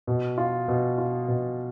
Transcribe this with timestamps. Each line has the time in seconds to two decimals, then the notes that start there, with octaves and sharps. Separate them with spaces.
0.07 B2
0.38 F4
0.68 B2
0.98 F4
1.28 B2